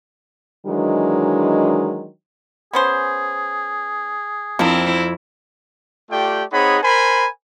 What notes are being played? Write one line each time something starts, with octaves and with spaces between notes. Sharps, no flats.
D#3 E3 F#3 G#3 D4
B3 C#4 G#4 C5
F2 C4 D4 E4 F4 A#4
A3 F4 G4 D5 G5
C4 D#4 G#4 C#5 F#5 B5
A#4 C5 G#5 B5